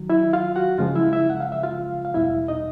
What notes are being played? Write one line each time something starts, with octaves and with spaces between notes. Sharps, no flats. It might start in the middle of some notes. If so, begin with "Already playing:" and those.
Already playing: D#3 F#3
E4 E5
F4 F5
F#4 F#5
F#2 C#3 F3 G#3 F4 F5
E4 E5
E4 E5
F#5
F5
E5
F4 F5
F5
E2 B2 G3 E4 E5
D#4 D#5